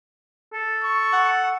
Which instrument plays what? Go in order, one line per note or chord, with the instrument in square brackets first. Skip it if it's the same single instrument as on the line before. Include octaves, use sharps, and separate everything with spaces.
[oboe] A4
[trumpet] C#6
[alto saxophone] F#5